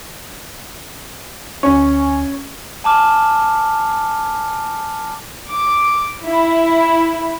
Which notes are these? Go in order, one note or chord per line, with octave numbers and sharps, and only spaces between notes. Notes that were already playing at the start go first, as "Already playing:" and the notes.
D2 C#4 G#5 C#6
G#5 A5 D6 F6
D6
E4